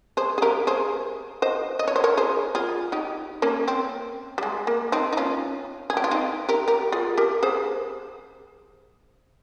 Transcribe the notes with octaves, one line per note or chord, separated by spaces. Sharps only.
G#4 C5
G#4
G4 A#4
G#4 C5
C5 D#5
D#5
C#5
C5
A#4 C#5
G#4 C5
F4 G#4
D#4 G4
A#3 C#4
C4
G3
G#3
A#3
C4 D#4
D#4
C#4 F4
G#4
G4
F4
C4 D#4
G4 A#4
G4 A#4
F4 G#4
G4 A#4
G#4 C5